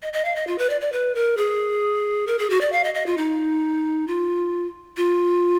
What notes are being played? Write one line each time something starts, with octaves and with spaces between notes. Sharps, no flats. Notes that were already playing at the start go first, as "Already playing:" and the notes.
D#5
D#5
F5
D#5
F4
B4
D5
D5
B4
A#4
G#4
A#4
G#4
F#4
D5
F5
D#5
D#5
F4
D#4
F4
F4